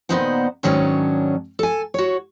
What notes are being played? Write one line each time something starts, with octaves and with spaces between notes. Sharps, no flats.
A#2 D#3 B3 D#4 C5 F#5
G#2 D#3 F#3 C#4 D4
A4 G#5
F#4 C#5